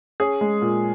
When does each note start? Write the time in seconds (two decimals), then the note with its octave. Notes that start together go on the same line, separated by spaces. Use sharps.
0.20 C#4 G#4
0.41 G#3
0.61 A#2